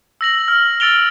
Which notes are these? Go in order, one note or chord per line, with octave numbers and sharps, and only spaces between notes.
E6 A#6 F#7
F6
E6 A6 D7 F7 G7